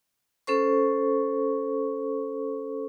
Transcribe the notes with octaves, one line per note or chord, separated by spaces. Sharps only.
C#4 A4 C5 C#6